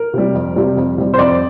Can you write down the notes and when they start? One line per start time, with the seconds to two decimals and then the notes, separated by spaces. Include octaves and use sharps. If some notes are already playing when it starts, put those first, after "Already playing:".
Already playing: A#4
0.14 C3 G3
0.34 F2
0.56 C3 G3
0.77 F2
0.98 C3 G3
1.14 C5
1.18 F2 D5